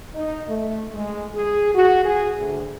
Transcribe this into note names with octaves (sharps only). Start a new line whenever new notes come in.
D#4
A3
G#3
G#4
F#4
G#4
D2